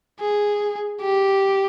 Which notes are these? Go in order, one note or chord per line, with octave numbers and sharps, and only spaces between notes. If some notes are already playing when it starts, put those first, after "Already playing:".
G#4
G4